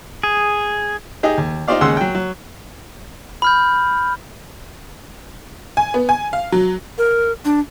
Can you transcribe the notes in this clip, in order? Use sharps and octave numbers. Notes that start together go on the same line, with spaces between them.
G#4
D#4 G4 G#4 D#5
D#2
D#4 F4 G4 C5 D5 F5
D#2 C#3 G#3 F#5 C6 E6
F#3 G5
F#3
B5 F6 G6
G#5
B3
G#5
F5
F#3
A#4
D4